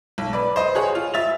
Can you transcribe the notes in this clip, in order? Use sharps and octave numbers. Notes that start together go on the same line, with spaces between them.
B1
B4 D5
C5 D#5
F#4 G#4 C#5 F#5
F4
E5 A6 F7